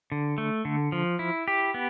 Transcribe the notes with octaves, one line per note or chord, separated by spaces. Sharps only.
D3
A3
D3
F3
E4
G4
B3